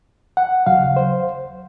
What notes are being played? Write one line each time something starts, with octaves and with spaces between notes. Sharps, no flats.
F#5
D#2 C#3 F#3 F5
C5